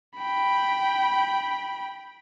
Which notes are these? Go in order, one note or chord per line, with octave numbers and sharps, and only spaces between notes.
G5 B5